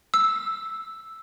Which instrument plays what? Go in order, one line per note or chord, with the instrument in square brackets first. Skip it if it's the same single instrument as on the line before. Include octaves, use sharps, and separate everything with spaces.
[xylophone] E6